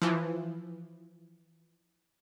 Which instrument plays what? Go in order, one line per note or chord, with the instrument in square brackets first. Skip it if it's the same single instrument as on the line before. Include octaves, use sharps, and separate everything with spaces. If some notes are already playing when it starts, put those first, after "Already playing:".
[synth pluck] E3 F3